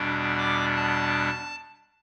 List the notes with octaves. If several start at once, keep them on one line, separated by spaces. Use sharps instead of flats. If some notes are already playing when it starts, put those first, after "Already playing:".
Already playing: E2 B2 G3 D4
D6
A5